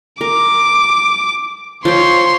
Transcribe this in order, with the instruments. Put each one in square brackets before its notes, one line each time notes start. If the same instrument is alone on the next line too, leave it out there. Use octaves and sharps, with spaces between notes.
[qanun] A#4 [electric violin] D6
[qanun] F3 C5 G5 [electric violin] C#5 C6